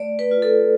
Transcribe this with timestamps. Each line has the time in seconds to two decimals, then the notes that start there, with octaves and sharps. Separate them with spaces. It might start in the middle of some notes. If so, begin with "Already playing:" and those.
Already playing: A3 D5
0.19 B4
0.31 F4
0.42 A4